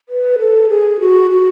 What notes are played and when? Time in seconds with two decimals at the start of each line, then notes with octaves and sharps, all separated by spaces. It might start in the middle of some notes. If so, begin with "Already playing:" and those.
0.09 B4
0.39 A4
0.69 G#4
1.00 F#4
1.30 F#4